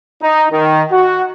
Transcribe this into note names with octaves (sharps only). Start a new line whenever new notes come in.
D#4
D#3
F#4